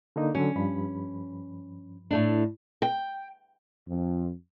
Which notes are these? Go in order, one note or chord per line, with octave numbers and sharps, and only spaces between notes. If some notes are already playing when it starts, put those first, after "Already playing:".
D3 A#3 D#4
D3 F#3 C#4
G2 F3 B5
A2 A3 D4
G5
F2